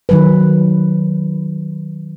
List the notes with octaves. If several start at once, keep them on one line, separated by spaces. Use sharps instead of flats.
D#3 F#3 B4